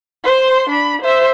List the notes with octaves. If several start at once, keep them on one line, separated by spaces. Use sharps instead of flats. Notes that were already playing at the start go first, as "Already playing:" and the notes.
C5 C6
D4 B5
C5 E5